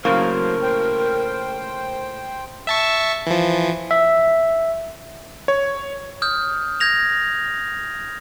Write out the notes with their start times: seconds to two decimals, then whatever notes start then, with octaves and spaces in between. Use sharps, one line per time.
0.05 A2 C#3 F#3 A#3 A#4 C5
0.63 C5 G5
2.67 E5 A5 C#6
3.27 E3 F3
3.91 E5
5.48 C#5
6.22 D#6 F6 G6
6.80 G6 G#6 A#6 F7